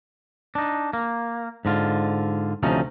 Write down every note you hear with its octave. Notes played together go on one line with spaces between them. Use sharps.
D4 D#4
A#3
G#2 D3 F4
D2 C3 F3 C#4 D#4